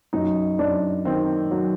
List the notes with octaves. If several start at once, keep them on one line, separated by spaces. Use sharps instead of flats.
F#2 D#4
F#2 D4
D#3 C4
F#3